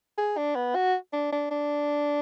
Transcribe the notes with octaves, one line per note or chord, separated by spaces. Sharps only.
G#4
D4
B3
F#4
D4
D4
D4